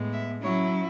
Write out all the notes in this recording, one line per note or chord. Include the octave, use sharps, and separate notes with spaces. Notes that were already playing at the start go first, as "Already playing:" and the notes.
Already playing: A2 G#3 B3
E5
F#3 C#4 E4 C#5